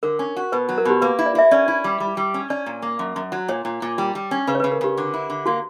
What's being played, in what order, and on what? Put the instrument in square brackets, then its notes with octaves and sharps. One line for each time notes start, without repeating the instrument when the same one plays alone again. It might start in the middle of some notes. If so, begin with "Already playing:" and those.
[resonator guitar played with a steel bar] D3 [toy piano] A#4
[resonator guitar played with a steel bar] C#4
F#4
[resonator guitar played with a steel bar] B2 [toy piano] B4
[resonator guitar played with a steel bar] F#3
[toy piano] A#4
[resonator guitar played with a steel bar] B2 [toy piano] G4
[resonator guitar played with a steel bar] A#3 [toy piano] B4
[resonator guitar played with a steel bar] E4
[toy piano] D5
[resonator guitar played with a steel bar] E4 [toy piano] E5
[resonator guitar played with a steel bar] C#4 [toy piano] D5
[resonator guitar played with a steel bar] E4
G3
G3
G3
C#4
[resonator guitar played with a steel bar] C#4 [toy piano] D5
[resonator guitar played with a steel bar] A#2
A#3
F#2
F#2
F#3
[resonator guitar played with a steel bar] A#2 [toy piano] C#5
[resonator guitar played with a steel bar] A#2
A#2
G3
G3
C#4
[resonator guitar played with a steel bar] C#3 [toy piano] B4
[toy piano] C#5
[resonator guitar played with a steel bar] C#3 [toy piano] B4
[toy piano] A#4
[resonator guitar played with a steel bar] C#3 [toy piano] G4
[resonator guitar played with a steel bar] D3
E4
D3
[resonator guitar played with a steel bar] A#3 [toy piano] F#4